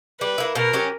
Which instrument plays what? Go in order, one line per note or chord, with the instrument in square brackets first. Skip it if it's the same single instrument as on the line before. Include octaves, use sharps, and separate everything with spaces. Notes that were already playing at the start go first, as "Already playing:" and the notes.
[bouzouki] G3 [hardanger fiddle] B4
[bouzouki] A#3 E4
[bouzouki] B2 [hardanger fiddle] A#4
[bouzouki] F#3 C#4 G4